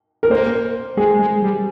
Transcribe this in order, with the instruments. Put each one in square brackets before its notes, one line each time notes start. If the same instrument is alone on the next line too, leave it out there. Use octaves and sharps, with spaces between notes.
[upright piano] A#4
[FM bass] A#3 [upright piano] C5
[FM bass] G#3 [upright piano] G#4
[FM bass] G#3
G3